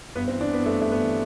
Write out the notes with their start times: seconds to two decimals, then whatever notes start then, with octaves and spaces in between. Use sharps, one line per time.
0.15 G2 B3
0.28 C4
0.32 E3
0.41 D4
0.49 E3 B3
0.66 G2 A3
0.81 G2 A3
0.92 B3
1.00 E3